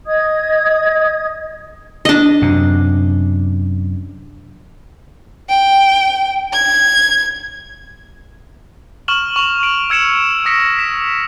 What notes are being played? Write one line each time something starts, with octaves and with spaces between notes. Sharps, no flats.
D#5 D#6 G#6
D4 D#5
F#2 C3
G5
G#6
C#6 F6 E7 F#7
C#6 F7 F#7
D7
E6 G#6 C#7 E7
D#6 A#6 B6 C#7
B6 E7